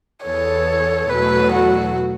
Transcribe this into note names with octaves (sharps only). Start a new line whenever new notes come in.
E2 E3 B3 A4 C#5
E2 B2 F#3 A3 B4
F#4